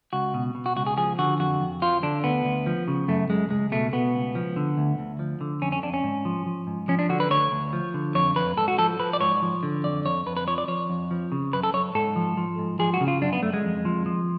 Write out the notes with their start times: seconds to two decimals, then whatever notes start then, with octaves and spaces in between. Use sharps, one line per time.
0.13 C#2 F#4
0.34 B2
0.55 B2
0.66 F#4
0.76 C#2 F#4
0.87 G#4
0.97 F3 G#4
1.19 D3 F#4
1.39 F2 F#4
1.60 F2
1.82 F3 F4
2.03 D3 D4
2.24 D2 B3
2.45 D2
2.66 F3
2.88 C#3
3.08 F#2 A3
3.30 F#2 G#3
3.51 C#2 G#3
3.72 B2 A3
3.93 B2 B3
4.14 C#2
4.35 F3
4.56 D3
4.78 D2
4.99 D2
5.19 F3
5.41 D3
5.62 F2 C#4
5.72 C#4
5.83 F2 D4
5.94 C#4
6.04 G#2
6.25 F3
6.46 F3
6.67 G#2
6.88 F3 C#4
6.99 D4
7.09 D3 F#4
7.20 B4
7.30 D2 C#5
7.52 D2
7.73 F3
7.94 D3
8.15 F2 C#5
8.36 F2 B4
8.57 G#2 A4
8.68 F#4
8.78 F3 A4
8.99 F3 B4
9.13 D5
9.21 G#2 C#5
9.42 F3
9.63 D3
9.84 F2 D5
10.05 F2 C#5
10.26 F2 B4
10.37 B4
10.47 F3 C#5
10.58 D5
10.68 F3 C#5
10.90 F2
11.11 F3
11.32 C#3
11.53 F#2 B4
11.63 A4
11.74 F#2 C#5
11.95 G#2 A4
12.16 F3
12.37 F3
12.58 G#2
12.79 F3 G#4
12.94 F#4
13.01 C#3
13.08 F4
13.22 F#2 D4
13.33 B3
13.42 F#2 A3
13.53 G#3
13.64 F2
13.85 F3
14.06 F3